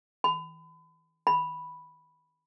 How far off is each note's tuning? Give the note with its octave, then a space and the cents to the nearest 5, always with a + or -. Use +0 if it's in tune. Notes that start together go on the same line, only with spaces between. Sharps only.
B5 +35
B5 -5